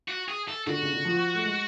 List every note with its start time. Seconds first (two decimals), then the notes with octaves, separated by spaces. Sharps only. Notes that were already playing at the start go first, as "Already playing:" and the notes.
0.09 F#4
0.29 G#4
0.48 A4
0.67 D3 F#4
0.82 C#3
0.94 D3
1.05 F3
1.35 A3
1.44 G#3